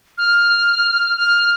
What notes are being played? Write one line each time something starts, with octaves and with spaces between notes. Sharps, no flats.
F6
F6